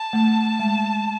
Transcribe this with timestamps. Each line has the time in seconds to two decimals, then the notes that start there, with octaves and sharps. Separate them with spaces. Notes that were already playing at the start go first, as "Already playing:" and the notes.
Already playing: A5
0.13 A3
0.60 G#3